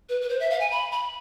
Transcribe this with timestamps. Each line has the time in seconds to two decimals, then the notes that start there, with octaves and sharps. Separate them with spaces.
0.09 B4
0.21 B4
0.29 C5
0.40 E5
0.50 F5
0.60 G#5
0.71 B5
0.92 B5